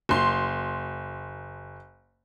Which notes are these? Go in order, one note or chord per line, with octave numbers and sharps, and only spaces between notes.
F#1 C6